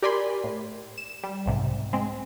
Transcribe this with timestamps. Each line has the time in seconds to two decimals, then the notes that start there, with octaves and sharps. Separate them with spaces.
0.02 G4 A#4 D5 G#5 B5 C6
0.44 A2
0.98 E7
1.23 G3
1.46 B1 G#2 C3
1.93 G#3 C4